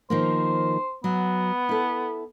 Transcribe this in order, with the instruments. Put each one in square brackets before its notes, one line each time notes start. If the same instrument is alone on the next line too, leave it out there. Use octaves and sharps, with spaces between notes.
[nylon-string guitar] D#3 F3 A#3 [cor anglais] C5
[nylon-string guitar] F#3 [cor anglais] B3
[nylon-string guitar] E4 A4